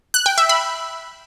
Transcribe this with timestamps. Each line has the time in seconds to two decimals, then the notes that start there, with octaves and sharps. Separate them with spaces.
0.14 F#6
0.26 G5
0.38 E5
0.49 B5